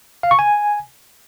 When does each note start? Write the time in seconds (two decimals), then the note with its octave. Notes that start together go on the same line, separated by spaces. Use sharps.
0.23 F5
0.31 C#6
0.39 G#5